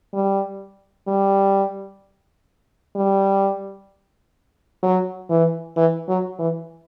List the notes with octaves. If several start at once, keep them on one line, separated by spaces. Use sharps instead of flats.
G3
G3
G3
F#3
E3
E3
F#3
E3